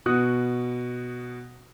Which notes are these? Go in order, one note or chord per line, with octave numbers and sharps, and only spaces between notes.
B2 F#4 F#5 D#6 F#6